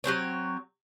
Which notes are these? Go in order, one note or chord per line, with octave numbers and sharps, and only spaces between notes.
F#3 G#3 C4 C#5